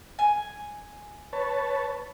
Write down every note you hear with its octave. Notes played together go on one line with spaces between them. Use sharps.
G#5
B4 C#5 A5